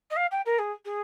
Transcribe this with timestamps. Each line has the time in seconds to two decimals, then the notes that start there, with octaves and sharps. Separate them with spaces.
0.10 D#5
0.16 F5
0.31 G5
0.46 A#4
0.59 G#4
0.85 G#4